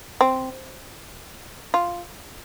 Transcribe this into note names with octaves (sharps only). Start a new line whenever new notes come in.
C4
F4